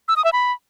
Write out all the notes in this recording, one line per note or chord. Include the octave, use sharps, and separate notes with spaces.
E6
D#6
E5
B5